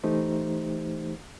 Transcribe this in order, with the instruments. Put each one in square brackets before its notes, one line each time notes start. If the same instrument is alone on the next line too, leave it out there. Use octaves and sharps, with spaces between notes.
[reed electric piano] E3 A3 D#4 G4 C5